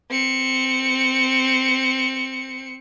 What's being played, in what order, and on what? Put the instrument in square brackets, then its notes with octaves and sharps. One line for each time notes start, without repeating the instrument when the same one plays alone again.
[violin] C4 C#7